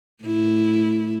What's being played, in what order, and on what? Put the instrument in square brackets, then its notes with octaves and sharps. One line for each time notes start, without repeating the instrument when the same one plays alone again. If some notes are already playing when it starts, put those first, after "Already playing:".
[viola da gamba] A2 E4